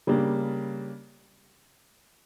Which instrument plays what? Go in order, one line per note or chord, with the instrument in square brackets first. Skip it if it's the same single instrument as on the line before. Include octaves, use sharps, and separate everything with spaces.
[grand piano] C#3 G3 A#3 D4